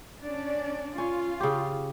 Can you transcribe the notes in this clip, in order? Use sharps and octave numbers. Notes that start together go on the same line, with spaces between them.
C#4 D4 D5
C#4 F4
C#3 G4